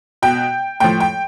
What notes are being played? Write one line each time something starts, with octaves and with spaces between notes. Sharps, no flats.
B2 G5
A2 F3 G5
G5